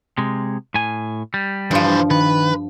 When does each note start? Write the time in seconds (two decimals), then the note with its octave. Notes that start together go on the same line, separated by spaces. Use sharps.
0.18 C3 G#3
0.74 A2 G#5
1.34 G3
1.71 G2 E3 F3 C5
2.11 D#3 B4